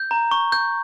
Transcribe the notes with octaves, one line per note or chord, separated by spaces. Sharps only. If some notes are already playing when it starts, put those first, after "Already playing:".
Already playing: G6
A#5
C#6
G6